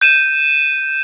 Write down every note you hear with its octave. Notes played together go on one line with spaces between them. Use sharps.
G6 D#7 E7